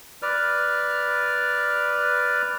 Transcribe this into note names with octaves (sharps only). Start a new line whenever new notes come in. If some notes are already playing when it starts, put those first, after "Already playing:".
B4 D5 F6